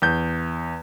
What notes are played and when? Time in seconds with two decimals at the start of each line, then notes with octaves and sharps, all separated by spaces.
0.02 E2 G6